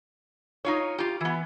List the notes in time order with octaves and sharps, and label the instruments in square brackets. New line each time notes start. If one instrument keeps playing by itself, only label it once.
[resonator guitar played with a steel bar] D#4 F4 C#5
F4 G4
E3 B3